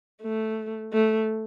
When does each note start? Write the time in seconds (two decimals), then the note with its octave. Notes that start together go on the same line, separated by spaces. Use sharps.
0.22 A3
0.93 A3